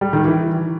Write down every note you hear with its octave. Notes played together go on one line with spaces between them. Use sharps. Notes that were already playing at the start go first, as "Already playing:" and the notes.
G3
D#3
E3